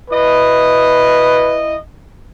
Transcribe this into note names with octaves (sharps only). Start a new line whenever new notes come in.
E4 B4 D#5